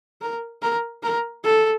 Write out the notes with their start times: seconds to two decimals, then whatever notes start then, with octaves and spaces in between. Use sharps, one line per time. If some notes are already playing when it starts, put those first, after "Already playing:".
0.21 A#4
0.62 A#4
1.03 A#4
1.44 A4